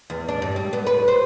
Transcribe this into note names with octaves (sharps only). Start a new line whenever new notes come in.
E2
D4
G2
G3
B3
B4
C5